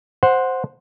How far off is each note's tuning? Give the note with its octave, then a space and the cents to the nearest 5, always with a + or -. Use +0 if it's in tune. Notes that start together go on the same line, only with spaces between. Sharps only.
C5 +0 F#5 -10